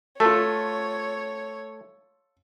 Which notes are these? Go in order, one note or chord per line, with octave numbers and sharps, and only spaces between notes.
A3 F4 A4 C#5